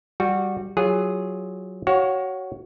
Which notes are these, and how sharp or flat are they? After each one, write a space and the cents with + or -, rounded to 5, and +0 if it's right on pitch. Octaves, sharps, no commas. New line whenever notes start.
G3 +0 F#4 -15
F#3 +0 F4 +0 G#4 -15
F#4 +20 C#5 +0 F5 +35